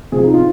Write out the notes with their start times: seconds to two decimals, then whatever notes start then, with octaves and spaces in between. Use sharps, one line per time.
0.12 C3 F3 G#4
0.24 D#4
0.34 F4